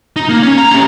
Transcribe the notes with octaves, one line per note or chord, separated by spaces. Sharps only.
D#4
A#3
C#4
A#5
C#4 G4